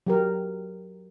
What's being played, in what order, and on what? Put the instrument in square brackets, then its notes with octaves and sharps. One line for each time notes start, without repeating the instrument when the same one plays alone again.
[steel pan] F#3 G4 A#4